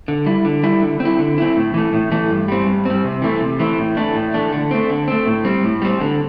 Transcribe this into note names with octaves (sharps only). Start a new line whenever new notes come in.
D3
G3 E4
D3
G3 E4
D3
C4
E4
D3
C4 E4
A2
E3 A3
A2
E3 A3
G2
G3 C4
G2
G3 C4
C3
E3 A3 C4
C3
E3 A3 C4
A2
E3 A3 D4
A2
E3 A3 D4
D3
A3 C4
D3
A3 C4
A2
G3 C4
A2
G3 C4
D3